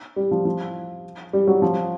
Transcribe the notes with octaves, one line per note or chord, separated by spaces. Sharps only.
G3
F3
F3
G3
F#3
F3